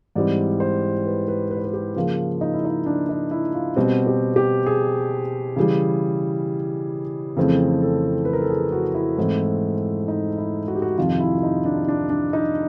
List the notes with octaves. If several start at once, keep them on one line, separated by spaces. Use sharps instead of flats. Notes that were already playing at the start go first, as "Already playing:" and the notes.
G#2 E3 G3 C4 D5
C5
B4
B4
B4
C5
B4
G4
C#3 F3 A#3 F4
D#4
E4
D#4
D4
D#4
E4
F4
B2 G3 C4 F#4
G4
G4
G#4
C#3 E3 G3
F2 C#3 E3 A3 C4
A4
B4
A#4
A4
G#4
F#4
E4
G#2 E3 A3 C4
D#4
E4
F#4
G4
F#4
F2 C3 D#3 F4
E4
D#4
D4
D4
D4
D#4